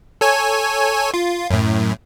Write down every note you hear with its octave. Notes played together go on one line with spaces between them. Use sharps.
A4 C#5 G#5
F4
F#2 A2